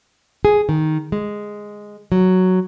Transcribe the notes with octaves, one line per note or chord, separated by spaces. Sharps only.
G#4
D#3
G#3
F#3